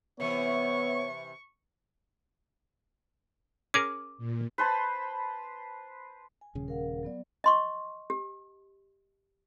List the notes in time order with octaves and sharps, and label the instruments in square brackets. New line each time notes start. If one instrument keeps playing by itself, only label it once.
[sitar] C3 E3 [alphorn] B3 [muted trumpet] C#5 [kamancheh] C#6
[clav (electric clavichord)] C#4 G#4 A#4 [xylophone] D6
[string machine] A#2
[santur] B4 C5 A5 B5
[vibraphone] G#5
[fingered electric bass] D#1 C#3
[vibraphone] A#4 F5 F#5
F#3 B3 D5
[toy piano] D#5 C6 C#6
G4